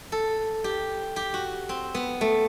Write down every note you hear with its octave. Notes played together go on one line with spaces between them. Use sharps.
A4
G4
G4
F#4
C4
B3
A3